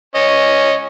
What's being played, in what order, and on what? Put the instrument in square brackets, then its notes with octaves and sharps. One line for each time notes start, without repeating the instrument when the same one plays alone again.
[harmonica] C#4 D#5